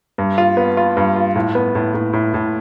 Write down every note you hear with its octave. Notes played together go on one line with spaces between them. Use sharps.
G2
F4
B3
F4
G2
F4
A2
B3
A2
A2
A2
A2